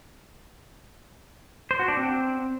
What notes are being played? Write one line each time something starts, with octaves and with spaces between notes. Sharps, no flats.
C5
F#4
D4
C4